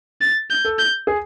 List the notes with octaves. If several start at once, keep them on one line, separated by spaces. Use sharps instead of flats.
A6
G6
A4
G6
G#4